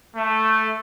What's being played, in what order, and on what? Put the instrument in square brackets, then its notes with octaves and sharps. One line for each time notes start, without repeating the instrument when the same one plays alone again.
[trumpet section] A3